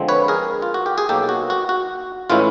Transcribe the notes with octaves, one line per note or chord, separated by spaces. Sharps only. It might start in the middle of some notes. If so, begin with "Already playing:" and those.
Already playing: D3 F3 G#3 C4
B4 C#5
G#4 A#4
F4
F#4
G4
G#4
B2 F#3 A#3 D#4 G4 A4
F#4
F#4
F#4
A2 E3 G#3 C#4 E4 F4